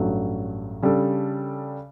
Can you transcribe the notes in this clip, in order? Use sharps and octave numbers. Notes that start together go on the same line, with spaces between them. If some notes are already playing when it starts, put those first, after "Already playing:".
Already playing: A1 G2 F#3 A3
C#3 G3 D4 A4